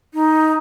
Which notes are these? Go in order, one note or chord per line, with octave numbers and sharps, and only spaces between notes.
D#4